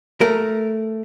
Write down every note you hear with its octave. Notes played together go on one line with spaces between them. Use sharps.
A3 A#4